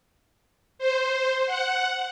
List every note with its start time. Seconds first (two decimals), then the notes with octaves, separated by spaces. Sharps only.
0.79 C5
1.46 F#5